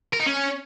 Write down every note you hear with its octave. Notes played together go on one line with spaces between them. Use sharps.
A#4
D#4
C#4